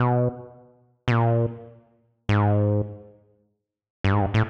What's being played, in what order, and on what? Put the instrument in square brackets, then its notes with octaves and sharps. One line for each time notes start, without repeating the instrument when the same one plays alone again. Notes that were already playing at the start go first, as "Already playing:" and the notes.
Already playing: [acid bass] B2
B2
A#2
G#2
G2
G#2
G2
A2